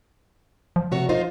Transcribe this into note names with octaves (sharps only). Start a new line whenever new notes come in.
F3
C3 F#4 C#5
D#4 F4 C5